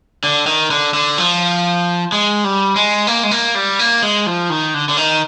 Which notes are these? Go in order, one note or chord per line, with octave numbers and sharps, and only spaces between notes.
D3
D#3
D3
D3
F3
G#3
G3
G#3
A#3
G#3
A#3
G3
A#3
G#3
F3
D#3
D3
D3
D#3